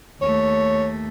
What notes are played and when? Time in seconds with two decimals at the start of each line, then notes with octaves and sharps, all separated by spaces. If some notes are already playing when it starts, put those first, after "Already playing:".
0.22 D#2 A3 C#5